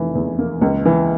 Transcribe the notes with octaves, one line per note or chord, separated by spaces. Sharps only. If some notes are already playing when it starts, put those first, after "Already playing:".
Already playing: F1 E3
E2
A#3
C#2
E3